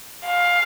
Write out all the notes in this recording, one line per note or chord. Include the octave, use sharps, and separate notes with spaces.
F5